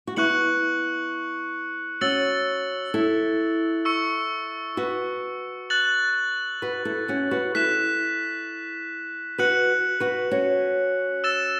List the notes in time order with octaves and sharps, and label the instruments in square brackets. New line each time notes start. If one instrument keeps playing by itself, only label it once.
[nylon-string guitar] F#4
[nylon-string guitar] B3 E4 [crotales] C#6 F#6 C#7 F#7
[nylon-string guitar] C#4 F#4 [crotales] E6 A6 C#7 F#7
[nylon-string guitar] E4 A4
[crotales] C#6 E6 C#7
[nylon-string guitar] F#4 B4
[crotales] F#6 A6 F#7
[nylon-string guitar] F#4 B4
E4 A4
C#4 F#4
F#4 B4
[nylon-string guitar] E4 A4 [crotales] F#6 B6 E7
[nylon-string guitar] F#4 B4 [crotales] F#6 C#7 F#7
[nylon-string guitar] F#4 B4
C#4 F#4
[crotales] E6 A6 E7